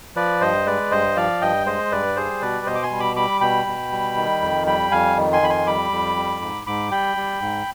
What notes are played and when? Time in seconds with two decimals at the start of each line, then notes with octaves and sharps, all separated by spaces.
0.16 F3 B4 D5
0.41 G2 C5 D#5
0.66 G#3 B4 D5
0.91 G2 C5 D#5
1.16 F3 D5 F5
1.42 G2 D#5 G5
1.66 G#3 C5 D#5
1.91 G2 B4 D5
2.16 G3 G#4 C5
2.42 B2 B4 D5
2.66 B2 C5 D#5
2.75 D6
2.83 G#5 C6
2.91 G3
3.00 B5 D6
3.16 G3 B5 D6
3.41 B2 G5 B5
3.67 B2
3.92 G3
4.16 D#3
4.42 F2
4.67 G3 G5 B5
4.91 F2 F5 G#5
5.17 D#3
5.33 G#5 C6
5.42 F2 B5
5.50 G#5 C6
5.67 G3 B5 D6
5.92 F2
6.16 G3
6.41 G#2
6.66 G#2 B5 D6
6.91 G3 G5 B5
7.17 G3
7.42 G#2